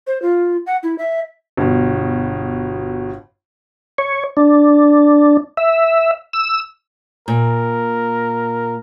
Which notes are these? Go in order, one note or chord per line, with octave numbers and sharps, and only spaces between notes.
C5
F4
F#5
E4
E5
G1 B2
C#5
D4
E5
E6
A#2 A#4